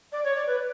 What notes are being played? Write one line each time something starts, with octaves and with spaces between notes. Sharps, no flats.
D5
C#5
D5
B4